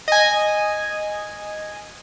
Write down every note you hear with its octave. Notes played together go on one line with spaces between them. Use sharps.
D#5 G#5